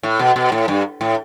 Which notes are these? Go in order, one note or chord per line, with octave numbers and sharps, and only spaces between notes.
A2
B2
B2
A2
G2
A2